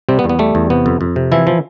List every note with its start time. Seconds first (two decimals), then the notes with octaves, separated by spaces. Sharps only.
0.09 C3 G3 C4
0.19 B3
0.24 E2
0.29 B3
0.39 G3 A3
0.55 E2
0.70 C3 B3
0.86 F2
1.01 F2
1.16 C3
1.32 E3 F3 E4
1.47 F3